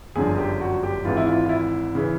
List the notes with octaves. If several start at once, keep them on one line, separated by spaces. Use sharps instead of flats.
G1 F#2 D3 F3 G#4
G4
F#4
G4
G#1 G#2 E3 F4
E4
F4
F4
E4
C#3 E3